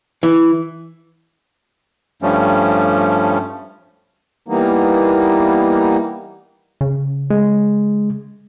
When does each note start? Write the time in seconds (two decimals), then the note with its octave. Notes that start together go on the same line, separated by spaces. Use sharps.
0.23 E3
2.22 G2 F3 G3 A3 C#4
4.48 E3 G3 A#3 B3 D#4
6.81 C#3
7.30 G#3